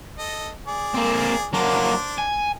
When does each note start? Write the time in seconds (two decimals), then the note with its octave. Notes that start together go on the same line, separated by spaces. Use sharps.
0.18 A4 D#5
0.67 G#4 D5
0.94 A#3 C4
1.53 F#3 A#3 D4 C5 D6
2.18 G#5